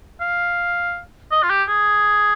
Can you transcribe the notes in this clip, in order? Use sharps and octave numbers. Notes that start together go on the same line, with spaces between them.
F5
D#5
F4
G4
G#4